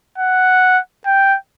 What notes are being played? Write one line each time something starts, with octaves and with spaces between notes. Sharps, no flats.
F#5
G5